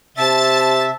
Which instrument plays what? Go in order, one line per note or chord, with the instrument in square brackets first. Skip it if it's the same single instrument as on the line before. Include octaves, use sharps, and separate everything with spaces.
[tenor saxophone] C3 [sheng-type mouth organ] E5 [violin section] A5 A6